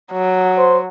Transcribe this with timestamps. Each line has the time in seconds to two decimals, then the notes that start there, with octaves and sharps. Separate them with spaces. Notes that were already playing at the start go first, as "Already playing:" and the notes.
0.12 F#3
0.58 C5